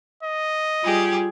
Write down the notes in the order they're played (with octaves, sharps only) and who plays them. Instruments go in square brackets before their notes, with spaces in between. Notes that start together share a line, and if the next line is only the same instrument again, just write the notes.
[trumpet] D#5
[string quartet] G3 G4 G#4 [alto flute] F4